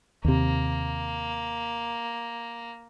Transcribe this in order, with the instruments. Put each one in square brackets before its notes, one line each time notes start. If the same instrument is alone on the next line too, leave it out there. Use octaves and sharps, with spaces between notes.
[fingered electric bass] D#2 C3 [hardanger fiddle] A#3